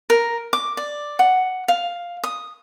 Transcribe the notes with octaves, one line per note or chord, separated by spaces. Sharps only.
A#4
D6
D5
F#5
F5
D#6